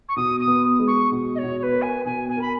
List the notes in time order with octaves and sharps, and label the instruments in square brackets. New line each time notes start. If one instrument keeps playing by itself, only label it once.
[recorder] C#6
[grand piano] B2 [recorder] D#6
[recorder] D#6
[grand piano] B3
G#3
[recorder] C#6
[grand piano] B2
[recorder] D#5
[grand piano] B2 [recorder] C#5
[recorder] C#5
B4
[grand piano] A#4
[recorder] G#5
[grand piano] B2 [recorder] G#5
[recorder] G#5
[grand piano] A#4 [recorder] B5